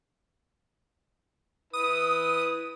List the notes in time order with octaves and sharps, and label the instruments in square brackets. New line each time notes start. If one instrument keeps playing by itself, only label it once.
[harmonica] E4 B4 [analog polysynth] D#6